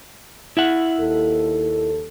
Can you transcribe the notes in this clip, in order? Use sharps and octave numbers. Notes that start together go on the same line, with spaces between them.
E4 E5 F#5
D#2 A4